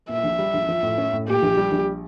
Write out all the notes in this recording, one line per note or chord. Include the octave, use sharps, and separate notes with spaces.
A#2 E5
A#1
G3
A#1
F3
A2
C#4
A2
A#2 G4
A#1
G3
A#1